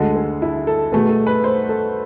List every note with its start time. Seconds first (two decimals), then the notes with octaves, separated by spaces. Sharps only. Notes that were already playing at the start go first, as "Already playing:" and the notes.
Already playing: D2 D3 G#3 A4
0.15 G#4
0.42 E4
0.67 A4
0.92 B2 A3 G#4
1.09 A4
1.27 B4
1.44 C5
1.69 A4